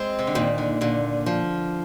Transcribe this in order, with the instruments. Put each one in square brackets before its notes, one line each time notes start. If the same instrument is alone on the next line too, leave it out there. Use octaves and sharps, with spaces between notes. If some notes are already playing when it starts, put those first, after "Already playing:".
Already playing: [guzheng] G#3 [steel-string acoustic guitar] C4
[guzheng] C3
D3
[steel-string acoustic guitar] A#2 [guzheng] D#3
[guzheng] D3
[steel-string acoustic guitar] A#2 [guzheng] D3
[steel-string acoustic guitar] F3